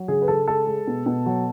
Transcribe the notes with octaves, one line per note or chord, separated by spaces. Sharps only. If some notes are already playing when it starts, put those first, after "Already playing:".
Already playing: F#3
C#3 G#4
B4
C#3 A4
G#3 A4
G#3
B2
B2
F#3